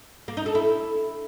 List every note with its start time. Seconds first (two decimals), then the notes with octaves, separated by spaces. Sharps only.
0.28 A#3
0.37 D#4
0.46 A4
0.55 E4